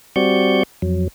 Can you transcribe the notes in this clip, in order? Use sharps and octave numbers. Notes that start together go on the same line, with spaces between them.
G3 C4 F#4 D5 C#6 G6
F2 F#3